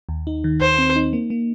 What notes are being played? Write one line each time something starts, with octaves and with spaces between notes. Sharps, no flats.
D#2
D#4
D#3
D#2 C5
C4
D#4
A#3
A#3